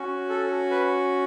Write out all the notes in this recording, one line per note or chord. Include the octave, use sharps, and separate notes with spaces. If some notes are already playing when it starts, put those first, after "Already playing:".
Already playing: C#4 F#4
A4
B4